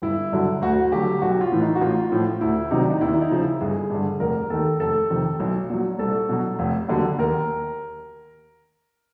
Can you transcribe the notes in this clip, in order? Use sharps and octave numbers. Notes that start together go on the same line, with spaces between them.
G1 E4
G2 D3 F#3
D2 F#4
D3 F#3 G4
B1 F#4
F4
A2 E3
D#4
F#4
A1 F4
A2 F3
D2 E4
C3 D#3 F#3 D#4
D4
D#4
D#2 E4
E4
D#4
C#3 F3
E4
G1 G#4
G2 D3
F1 A#4
D#2 D#3 A4
F1 A4
F2 C3 D#3
B1
A#2 F#3
C2 A4
B2 F#3
F1
D#2 D3 F#3
D#2 A#4